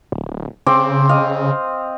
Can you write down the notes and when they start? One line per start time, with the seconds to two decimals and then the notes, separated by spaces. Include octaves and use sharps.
0.12 D1
0.67 C#3 C4 D6
1.09 D#5 F5